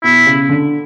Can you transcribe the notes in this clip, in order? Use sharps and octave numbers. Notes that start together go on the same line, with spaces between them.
B2 E4
C#3
D3